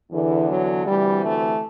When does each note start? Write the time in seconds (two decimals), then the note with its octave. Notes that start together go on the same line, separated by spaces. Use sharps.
0.11 E2 D3 E3
0.48 F#3
0.86 D2 C3 E3 G3
1.23 A3